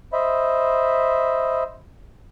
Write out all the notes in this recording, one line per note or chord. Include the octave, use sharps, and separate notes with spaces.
C5 D#5 E5 B5